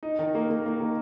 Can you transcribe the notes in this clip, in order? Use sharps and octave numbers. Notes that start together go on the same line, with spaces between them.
D#4
D#3
A#3
A#3
A#3
D#3